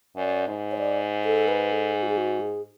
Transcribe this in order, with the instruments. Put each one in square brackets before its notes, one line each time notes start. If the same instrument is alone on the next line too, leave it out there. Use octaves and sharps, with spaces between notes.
[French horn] F#2 [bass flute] D5
[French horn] G#2
[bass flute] C#5
D5
A4
B4
A4
G#4
F#4
G#4
F#4
G#4